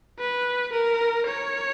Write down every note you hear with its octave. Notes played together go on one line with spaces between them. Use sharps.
B4
A#4
C#5